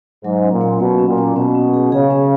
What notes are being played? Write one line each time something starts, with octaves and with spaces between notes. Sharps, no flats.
G#2 F#3
C#4
A#2
A#3
B2 A#3
C#4
A#2
C#4
B2 C#4
C#4
G#4
C#3 G#4
C#4